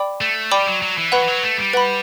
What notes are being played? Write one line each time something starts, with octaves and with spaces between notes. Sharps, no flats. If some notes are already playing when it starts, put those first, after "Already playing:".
Already playing: D5 G5 B5 D6
A3
G3 D5 G5 B5 D6
F#3
F#3
E3
F#3 B4 F#5 B5
E3
F#3
A3
G3
B4 F#5 B5